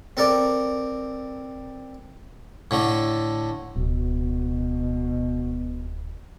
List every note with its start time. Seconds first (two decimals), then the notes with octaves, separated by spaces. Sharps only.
0.17 C4 A4 A#4 D5
2.71 A2 D3 A3
3.76 D1 B2